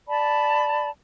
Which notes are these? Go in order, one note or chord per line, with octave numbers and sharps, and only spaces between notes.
D5 A5 B5